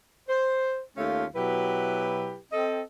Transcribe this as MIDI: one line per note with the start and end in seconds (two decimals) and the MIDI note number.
0.29 0.80 72
0.97 1.24 39
0.97 1.24 57
0.97 1.24 61
0.97 1.24 65
0.97 1.24 69
0.97 1.24 77
1.35 2.37 47
1.35 2.37 54
1.35 2.37 64
1.35 2.37 67
1.35 2.37 71
2.52 2.81 60
2.52 2.81 69
2.52 2.81 75